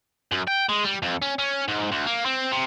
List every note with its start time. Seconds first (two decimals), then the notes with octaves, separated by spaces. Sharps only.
0.32 F#2
0.47 G5
0.69 G#3
0.84 G3
1.02 F2
1.22 C#4
1.39 C#4
1.68 G#2
1.92 D2
2.06 A#3
2.25 C4
2.52 C3